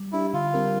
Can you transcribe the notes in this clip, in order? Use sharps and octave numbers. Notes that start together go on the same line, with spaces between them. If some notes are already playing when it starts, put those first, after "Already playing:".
Already playing: G3
D4 E4 G4
D3 F4
G3 C4 G4 A#4